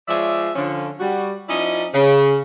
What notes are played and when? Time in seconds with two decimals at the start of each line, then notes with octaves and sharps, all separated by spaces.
0.08 F3 G#3 C#5 D5 E5
0.55 D3 F3 C#4
1.00 G3 F#4
1.49 F3 C#4 D#4 E4 D5 D#5
1.94 C#3